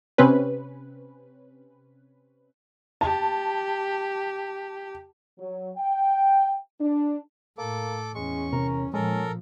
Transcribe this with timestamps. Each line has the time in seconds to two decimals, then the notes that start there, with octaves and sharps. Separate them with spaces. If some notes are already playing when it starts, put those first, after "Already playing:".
0.18 C3 C4 C#4 B4
3.01 G4 A5
5.39 F#3
5.77 G5
6.81 D4
7.58 A2 A#3 A4 D6
8.15 E2 G#3 C#4 C#6
8.53 C3 A#4
8.94 A#2 F3 G#3 C#4 A4 A#4